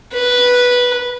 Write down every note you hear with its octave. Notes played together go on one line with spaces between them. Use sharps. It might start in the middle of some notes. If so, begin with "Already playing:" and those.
B4